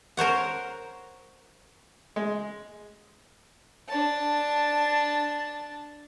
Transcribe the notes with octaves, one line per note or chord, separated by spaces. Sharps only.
A#4 C5 C#5 F#5
G#3
D4 A5